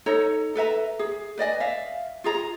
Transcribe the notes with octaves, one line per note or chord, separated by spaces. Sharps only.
D#4 A4 C#5 A#5
A4 B4 E5 A#5
G#4
B4 D5 D#5 G#5
E5 F5
F4 G#4 A#5